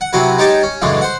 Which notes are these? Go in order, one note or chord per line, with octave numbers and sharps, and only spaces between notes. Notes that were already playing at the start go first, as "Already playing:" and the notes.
F#5
C3 F#3 C4 E4 F#4 B4
G#3 D#4 G4 C#5 G5 A5
C#4
F#2 A2 C#3 E3 G#3 D4
C5 F#5